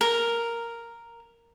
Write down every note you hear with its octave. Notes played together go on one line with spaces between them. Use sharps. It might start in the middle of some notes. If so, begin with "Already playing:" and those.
A#4